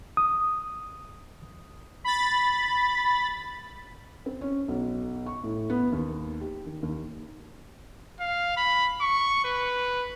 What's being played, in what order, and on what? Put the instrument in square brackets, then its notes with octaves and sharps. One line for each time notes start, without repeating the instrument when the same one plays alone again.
[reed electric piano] D#6
[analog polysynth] B5 A6
[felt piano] C4
C#4
B1
C#6
A2
B3
D#2
G4
D#3
D#2
[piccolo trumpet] F5
B5
C#6
B4